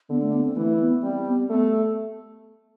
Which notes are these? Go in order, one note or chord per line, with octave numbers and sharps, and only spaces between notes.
D3 B3
A3
B3
C4
E3 A3
B3
G3 C4
B3
A3 B3